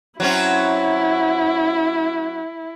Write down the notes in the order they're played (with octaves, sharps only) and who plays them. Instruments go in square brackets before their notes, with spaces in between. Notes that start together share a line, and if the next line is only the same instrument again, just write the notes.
[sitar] F#3 C4 C#4 [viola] E4